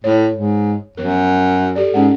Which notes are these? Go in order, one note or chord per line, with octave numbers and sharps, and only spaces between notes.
A2 C#5
G#2
F#2 F3 B3 A#4
G4 A4 D5
G#2 C#4 F#5